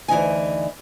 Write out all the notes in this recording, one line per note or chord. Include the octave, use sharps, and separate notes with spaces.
D2 E3 D#4 G#5